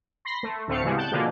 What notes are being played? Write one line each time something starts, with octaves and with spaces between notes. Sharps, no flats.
B5 C6 A#6 C7
A3
D2 A2 A3 C4 F5 C#7
C#3 E3 G3 G#3 B3
G5 A5 F#6 G6
B2 D3 F3 A#3 D4 G#4